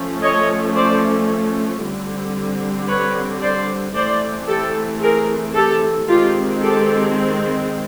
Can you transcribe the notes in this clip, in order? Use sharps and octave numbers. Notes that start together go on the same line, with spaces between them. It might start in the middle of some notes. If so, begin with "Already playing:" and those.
Already playing: F3 A3 C#4
C#5 D#5
C5 D5
D3 G3 C4
B4 C#5
C5 D5
E3 A3 C4 C5 D5
G4 A4
G#4 A#4
G4 A4
D#3 G#3 C4 F4 G4
G4 A4